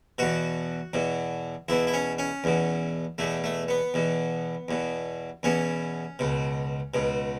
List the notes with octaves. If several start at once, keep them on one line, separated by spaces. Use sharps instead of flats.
E2 B2 F#4
E2 B2
E2 B2 E4
E4
C#4
C#4
E2 B2
E2 B2 A3
A3
B3
E2 B2
E2 B2
E2 B2 C#4
C#2 B2
C#2 B2